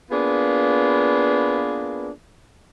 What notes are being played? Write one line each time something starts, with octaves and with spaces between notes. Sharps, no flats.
A#3 B3 D4 F4 G#4 B4